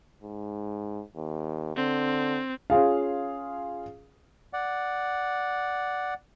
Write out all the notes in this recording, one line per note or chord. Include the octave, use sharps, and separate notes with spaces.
G#2
D#2
D3 C4
C#4 F4 G#4 F5
D5 F#5